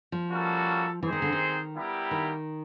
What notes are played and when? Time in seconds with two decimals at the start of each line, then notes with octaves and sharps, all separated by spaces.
0.12 F3
0.30 G3 A#3 C#4 F#4 A4
1.02 E3 C4 D#4 G#4 C5
1.12 D#3
1.22 D3
1.33 D#3
1.75 G3 B3 E4 G4 A#4
2.11 D#3